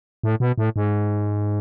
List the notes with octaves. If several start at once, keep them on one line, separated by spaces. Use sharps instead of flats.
A2
B2
A2
G#2